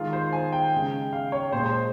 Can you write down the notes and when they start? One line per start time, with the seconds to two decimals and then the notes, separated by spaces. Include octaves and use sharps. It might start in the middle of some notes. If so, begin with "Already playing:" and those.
Already playing: D#3 G#3 F4
0.13 C5
0.33 G#5
0.52 G5
0.72 C#3 G#3
1.13 F5
1.32 C#5
1.52 A#2 G#3 C5
1.66 C5